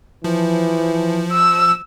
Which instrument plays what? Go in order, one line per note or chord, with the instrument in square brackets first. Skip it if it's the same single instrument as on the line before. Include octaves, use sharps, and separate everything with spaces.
[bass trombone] E3 [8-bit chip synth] F3
[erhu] E6